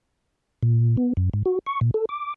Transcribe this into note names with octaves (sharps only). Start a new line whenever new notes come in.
A#2
B3
F#2
G#2
F#4
C#6
A#2
A4
D6